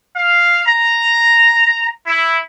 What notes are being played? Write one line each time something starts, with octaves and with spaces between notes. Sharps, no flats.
F5
A#5
E4